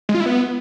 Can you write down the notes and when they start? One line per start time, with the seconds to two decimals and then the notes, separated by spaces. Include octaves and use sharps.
0.09 G#3
0.15 F4
0.20 E4
0.26 B3